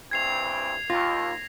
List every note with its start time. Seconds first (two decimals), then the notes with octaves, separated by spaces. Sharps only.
0.11 G2 E3 C4 G#6 C7 F7
0.90 D#2 F4 A#6